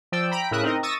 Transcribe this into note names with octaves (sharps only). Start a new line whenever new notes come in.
F3 D5 G5 E6
G5 A#5 B5 B6 D7
A2 C#3 A#4 E5 D#6 F#6
C4 D#4 A#4 D#5
C#6 D#6 E6 A6 A#6 D#7